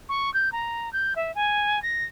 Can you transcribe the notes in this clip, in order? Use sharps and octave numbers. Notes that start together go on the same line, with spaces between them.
C#6
G6
A#5
G6
E5
G#5
A#6